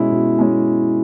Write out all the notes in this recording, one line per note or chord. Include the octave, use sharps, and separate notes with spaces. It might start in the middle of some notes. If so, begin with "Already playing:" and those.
Already playing: B2 G#3 C#4 E4
B2
G#3 C#4 E4